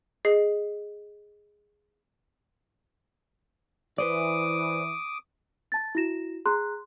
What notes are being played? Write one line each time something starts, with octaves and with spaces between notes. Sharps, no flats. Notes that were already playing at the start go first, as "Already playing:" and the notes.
G#4 D#5 C7
E3 B4 C5 D5 D6 D#6
A5 A6
E4 F#4 A#6 E7
G#4 A#5 C6 F#6